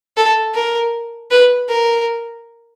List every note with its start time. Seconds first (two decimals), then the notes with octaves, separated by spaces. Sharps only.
0.17 A4
0.54 A#4
1.31 B4
1.69 A#4